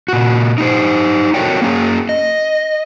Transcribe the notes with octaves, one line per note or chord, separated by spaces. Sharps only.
A#2 F#4
D#4 G4 C5
F#4 A4 A#4 C#5 D5 G5
A#3 C#4 G#4
D#5